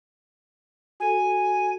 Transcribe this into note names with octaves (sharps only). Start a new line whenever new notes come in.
F#4 A4 G#5